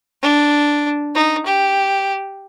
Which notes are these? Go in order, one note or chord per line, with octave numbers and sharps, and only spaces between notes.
D4
D#4
G4